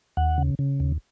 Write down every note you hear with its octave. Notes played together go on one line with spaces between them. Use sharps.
D#2 F#5
C#3
C#3
D#2